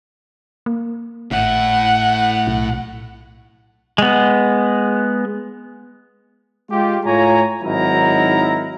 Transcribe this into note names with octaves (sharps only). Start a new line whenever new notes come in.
A#3
G#1 A2 F#5
B1
G#3 B3
G#3 F4 G4
A2 F4 C#5 G#5 A#5
G#1 F#3 D#4 E4 A#4 A#5